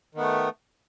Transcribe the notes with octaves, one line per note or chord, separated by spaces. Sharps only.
D#3 A3 B3